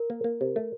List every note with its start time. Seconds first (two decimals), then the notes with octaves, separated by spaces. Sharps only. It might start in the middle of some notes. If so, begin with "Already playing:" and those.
Already playing: A#4
0.10 A#3
0.24 A#3
0.41 C3
0.56 A3